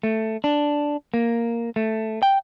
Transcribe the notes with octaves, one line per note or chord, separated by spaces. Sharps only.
A3
D4
A#3
A3
G5